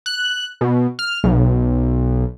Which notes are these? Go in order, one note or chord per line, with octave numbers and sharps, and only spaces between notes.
F#6
B2
F6
B1